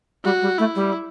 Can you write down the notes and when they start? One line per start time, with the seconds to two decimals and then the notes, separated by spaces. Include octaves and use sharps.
0.24 G3 F#4
0.41 G3
0.58 A3 E4
0.75 G3